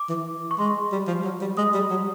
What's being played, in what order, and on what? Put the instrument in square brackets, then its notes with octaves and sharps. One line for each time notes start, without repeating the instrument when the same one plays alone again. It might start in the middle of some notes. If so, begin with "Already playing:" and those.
Already playing: [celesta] D6
[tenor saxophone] E3
[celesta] C#6
[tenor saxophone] G#3 [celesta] C6
[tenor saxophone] G3
F3
F#3
G3
[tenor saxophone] G#3 [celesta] D#6
[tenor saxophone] G3
F#3